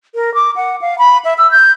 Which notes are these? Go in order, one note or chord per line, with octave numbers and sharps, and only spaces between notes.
A#4
D6
F#5
F5
B5
E5
E6
G6